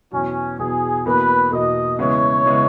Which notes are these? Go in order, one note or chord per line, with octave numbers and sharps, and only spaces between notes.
E2 B2 F#3 C#4
E2 B2 F#3 G#4
E2 B2 A#3 B4
E2 B2 A#3 D#5
E2 C#3 G#3 B3 E4 C#5
C#3 G#3 B3 E4